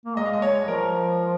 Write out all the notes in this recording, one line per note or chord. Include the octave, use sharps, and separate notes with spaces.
A#3
G#3 D#5
F5
D#5
C#5
G3
F3 A#4